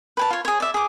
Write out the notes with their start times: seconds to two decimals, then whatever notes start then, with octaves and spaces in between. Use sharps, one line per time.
0.17 B4 G#5 A5
0.30 F4 C#5
0.45 G#4 C#5
0.60 D5 E5
0.74 G#4 D6